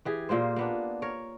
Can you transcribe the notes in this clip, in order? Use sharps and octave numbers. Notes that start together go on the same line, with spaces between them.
E3 G4 G#4
A#2 A#3 F4 C5
A#3 B3 D4
A#4 C#5